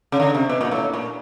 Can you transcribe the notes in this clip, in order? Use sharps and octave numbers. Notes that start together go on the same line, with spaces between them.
C#3
D3
C3
B2
A#2
A2
A#2